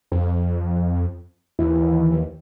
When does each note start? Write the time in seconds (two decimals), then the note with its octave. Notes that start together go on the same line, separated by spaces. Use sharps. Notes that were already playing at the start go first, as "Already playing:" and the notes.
0.12 F2
1.59 D#2 E3